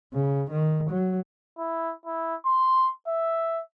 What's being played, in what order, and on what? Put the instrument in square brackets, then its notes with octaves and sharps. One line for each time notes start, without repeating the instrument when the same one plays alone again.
[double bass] C#3
D#3
F#3
[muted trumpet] E4
E4
C6
E5